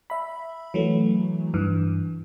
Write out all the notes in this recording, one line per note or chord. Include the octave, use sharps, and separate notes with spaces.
E5 B5
E3 F#3 A3
G2 E3